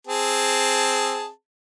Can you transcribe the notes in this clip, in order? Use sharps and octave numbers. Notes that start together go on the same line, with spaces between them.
C4 G#4 A5